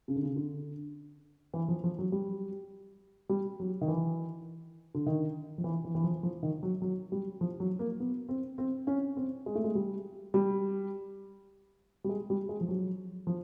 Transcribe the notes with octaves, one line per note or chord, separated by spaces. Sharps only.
C#3
D3
C#3
D3
E3
F3
F3
F#3
G3
G3
F#3
D#3
E3
D3
D#3
F3
E3
E3
E3
F3
F3
D#3
F#3
F#3
G3
F3
F#3
A#3
B3
C4
C4
C#4
C4
G#3
A3
G#3
G3
G3
G3
G#3
G3
G#3
F3
F#3
F3